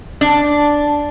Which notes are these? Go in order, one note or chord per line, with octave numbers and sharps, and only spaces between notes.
D4